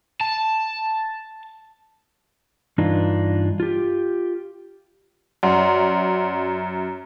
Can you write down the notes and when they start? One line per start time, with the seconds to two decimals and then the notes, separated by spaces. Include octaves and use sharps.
0.21 A5
2.78 G2 E3 D4 D#4 F4
3.60 F4 G4
5.43 F#2 D5 F#5 C6